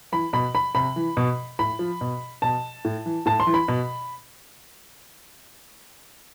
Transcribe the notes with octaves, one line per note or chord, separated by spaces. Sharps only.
E3 B5
B2 B5
B5
C3 B5
E3
B2
A2 B5
F3
B2
B2 A5
A2
E3
A2 A5
C6
E3
B5
B2